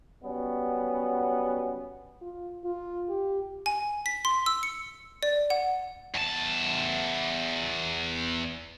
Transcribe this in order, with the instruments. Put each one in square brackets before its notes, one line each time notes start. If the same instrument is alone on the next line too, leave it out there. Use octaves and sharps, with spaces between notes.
[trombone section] F#3 G3 B3 C#4
[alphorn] F4
F4
G4
[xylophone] G#5
B6
C6
E6
C#7
D5
F#5
[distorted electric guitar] E2 A5